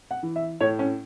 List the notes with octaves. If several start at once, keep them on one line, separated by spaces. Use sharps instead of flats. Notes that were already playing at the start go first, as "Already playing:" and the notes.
F#5
E3
E5
A2 C#5
C#4